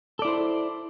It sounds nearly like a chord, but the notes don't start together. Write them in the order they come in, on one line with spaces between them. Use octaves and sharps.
A4 D5 E4 C5